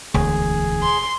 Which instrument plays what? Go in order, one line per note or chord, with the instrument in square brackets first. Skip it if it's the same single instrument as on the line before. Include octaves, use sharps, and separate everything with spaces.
[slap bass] E1 D2 [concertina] G#4
[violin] C6